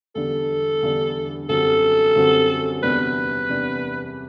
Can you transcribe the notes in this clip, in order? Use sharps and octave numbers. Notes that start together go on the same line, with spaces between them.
E2 D3 G3 D4 A4
E2 D3 G3 D4
F#2 D3 G3 C4 F#4 A4
F#2 D3 G3 C4 F#4
E2 C3 G3 B3 D4 B4
E2 C3 G3 B3 D4